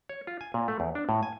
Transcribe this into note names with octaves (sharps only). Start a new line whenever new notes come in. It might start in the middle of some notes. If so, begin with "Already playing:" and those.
C#5
F4
G#5
A#2
A3
E2
D4
A2
G#5